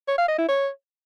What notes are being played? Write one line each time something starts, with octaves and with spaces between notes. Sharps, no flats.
C#5
F5
D#5
E4
C#5